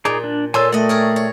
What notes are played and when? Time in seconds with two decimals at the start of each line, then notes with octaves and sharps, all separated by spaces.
0.05 A#2 D#4 G#4 D5
0.24 D4
0.54 A#2 A4 C#5 G#5 C6 E6
0.72 A3 D5 D#5 F#5 G5
0.89 G#4 A#4 C#5
1.16 C#5